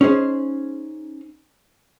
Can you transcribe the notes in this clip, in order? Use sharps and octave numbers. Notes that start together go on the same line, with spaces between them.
C#4 D#4 G#4 C5